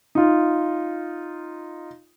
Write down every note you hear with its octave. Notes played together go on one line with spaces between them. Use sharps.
D#4 F4